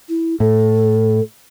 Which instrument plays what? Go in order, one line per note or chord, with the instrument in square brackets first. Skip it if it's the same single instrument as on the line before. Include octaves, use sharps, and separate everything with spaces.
[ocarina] E4
[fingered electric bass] A2 [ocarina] A4